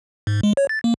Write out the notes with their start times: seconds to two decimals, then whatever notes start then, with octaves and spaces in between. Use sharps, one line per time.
0.27 G#2
0.43 G#3
0.57 C#5
0.69 A6
0.84 A#3